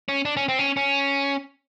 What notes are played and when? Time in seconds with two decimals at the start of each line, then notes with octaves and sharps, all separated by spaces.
0.09 C#4
0.25 D4
0.37 C#4
0.49 C4
0.59 C#4
0.77 C#4